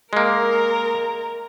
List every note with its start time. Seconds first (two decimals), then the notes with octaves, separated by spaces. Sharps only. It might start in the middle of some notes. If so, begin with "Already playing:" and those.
0.13 G#3 A#3 A#4